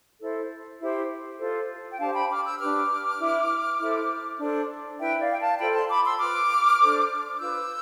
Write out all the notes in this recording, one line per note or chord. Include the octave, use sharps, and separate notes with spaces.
E4 A4 C5
E4 G4 C5
F4 A4 C5
G5
D4 G4 C5 F5 A5
G5 B5
D6 F6
E6 G6
D4 G4 B4 D6 F6
E4 B4
E4 A4 C5
D4 A4 C5
E4 B4 E5 G5
D5 F5
G5
F5 A5
F4 A4 C5 G5 B5
A5 C6
B5 D6
C6 E6
F4 B4 D6 F6
D4 A4 C5
F4 B4 E6 G6